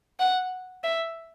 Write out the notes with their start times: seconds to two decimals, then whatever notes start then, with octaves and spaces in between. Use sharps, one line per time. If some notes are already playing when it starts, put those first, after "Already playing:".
0.20 F#5
0.84 E5